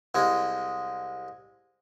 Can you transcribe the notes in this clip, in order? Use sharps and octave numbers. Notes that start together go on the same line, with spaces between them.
C2 G#3